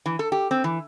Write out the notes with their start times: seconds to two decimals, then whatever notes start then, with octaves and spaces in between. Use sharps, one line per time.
0.06 E3
0.19 A4
0.32 G4
0.51 C4
0.64 E3